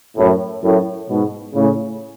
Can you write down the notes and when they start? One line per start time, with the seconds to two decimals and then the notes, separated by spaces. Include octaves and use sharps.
0.17 F#2 A2
0.63 F#2 A2
1.09 G#2 B2
1.55 A2 C#3